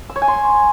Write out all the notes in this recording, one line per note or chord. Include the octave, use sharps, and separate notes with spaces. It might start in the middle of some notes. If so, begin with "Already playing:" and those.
E6
C#5
G#5
C6